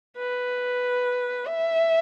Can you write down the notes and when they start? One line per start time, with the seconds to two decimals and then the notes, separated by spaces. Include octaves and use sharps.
0.18 B4
1.47 E5